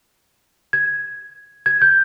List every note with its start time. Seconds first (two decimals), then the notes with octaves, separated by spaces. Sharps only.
0.73 G#6
1.66 G#6
1.82 G6